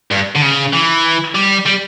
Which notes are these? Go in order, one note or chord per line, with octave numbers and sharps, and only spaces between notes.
G2
D3
C#3
E3
G3
G3